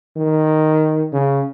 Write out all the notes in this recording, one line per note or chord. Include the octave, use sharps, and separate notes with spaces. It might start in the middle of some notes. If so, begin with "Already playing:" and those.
D#3
C#3